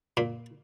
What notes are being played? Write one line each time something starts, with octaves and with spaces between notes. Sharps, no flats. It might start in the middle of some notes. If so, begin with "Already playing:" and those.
A#2